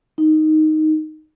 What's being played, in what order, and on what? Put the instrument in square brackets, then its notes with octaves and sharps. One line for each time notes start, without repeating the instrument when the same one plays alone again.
[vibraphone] D#4